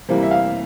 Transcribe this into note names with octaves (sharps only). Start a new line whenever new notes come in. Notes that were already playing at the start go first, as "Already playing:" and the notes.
C3 E3 G3 A#3
E5
F5